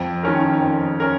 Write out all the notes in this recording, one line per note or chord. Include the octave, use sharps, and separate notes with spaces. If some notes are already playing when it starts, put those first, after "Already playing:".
Already playing: F2
D#3 C#4 A#4
F2
C#4 A#4